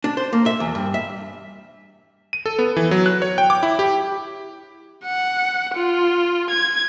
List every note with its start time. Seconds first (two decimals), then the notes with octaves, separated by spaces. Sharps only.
0.04 D4
0.17 C5
0.33 A#3
0.46 E5
0.60 E2
0.75 G2
0.94 E5
2.33 D#7
2.46 A4
2.59 B3
2.77 E3
2.91 F#3
3.06 F#6
3.22 C#5
3.38 G5
3.50 D6
3.63 E4
3.79 G4
5.05 F#5
5.74 F4
6.50 G#6